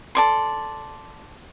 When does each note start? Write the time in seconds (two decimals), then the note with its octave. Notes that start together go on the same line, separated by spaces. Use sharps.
0.15 A4 D5 C6